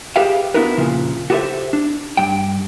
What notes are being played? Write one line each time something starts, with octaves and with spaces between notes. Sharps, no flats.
G4 G#4 B4 E5 F5 G5
B3 D4 E4 F#4 A#4 B4
F2 A#2 C#3 F3
F#4 G4 A4 B4 C5 E5
D4
G2 G5